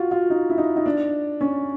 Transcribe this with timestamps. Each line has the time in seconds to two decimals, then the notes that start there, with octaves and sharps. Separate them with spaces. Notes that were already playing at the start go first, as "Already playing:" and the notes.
Already playing: F4 F#4
0.11 F4
0.30 D#4
0.50 E4
0.58 D#4
0.76 D#4
0.86 D4
1.41 C#4